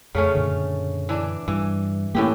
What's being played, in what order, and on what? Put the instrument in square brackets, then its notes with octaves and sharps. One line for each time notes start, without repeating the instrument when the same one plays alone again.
[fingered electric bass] F2 [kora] C#3 A3 C#4
[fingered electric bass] F#2 A#2 D3
[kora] E3 D4
[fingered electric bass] G2 [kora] E3
[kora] A2 E3 G4 [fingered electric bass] A#3 C#4